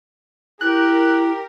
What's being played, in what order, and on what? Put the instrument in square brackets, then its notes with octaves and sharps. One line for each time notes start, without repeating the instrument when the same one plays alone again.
[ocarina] E4 [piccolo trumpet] G4 [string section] A#4 [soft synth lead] F#6